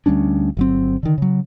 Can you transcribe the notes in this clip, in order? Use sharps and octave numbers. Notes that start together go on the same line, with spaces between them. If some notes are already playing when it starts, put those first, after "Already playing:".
D2 G3 C#4 D4
G1 F#3 C4
D3 D#3
C#3 F#3